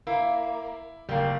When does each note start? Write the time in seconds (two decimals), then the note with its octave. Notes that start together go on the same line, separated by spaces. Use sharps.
0.07 A#3 E4
1.09 F#1 G3 A#3